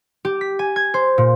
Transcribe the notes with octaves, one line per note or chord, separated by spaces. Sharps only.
G4
B6
G#5
G#6
C5
A#2